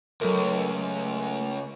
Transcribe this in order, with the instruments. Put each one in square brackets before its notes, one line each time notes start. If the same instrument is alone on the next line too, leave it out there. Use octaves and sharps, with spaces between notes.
[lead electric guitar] C#2 [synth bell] F#3 A#4 [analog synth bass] A3